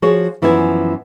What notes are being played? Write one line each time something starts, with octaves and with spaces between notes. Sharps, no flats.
F3 F#4 G#4 C#5
F#2 E3 F3 B3 E4 G#5